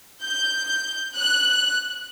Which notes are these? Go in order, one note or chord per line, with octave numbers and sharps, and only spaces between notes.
G6
F#6